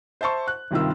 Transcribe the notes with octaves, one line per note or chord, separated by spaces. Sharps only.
C5 E5 A5 C6 C#6
F#6
G#1 G2 C3 D#3 F4 E6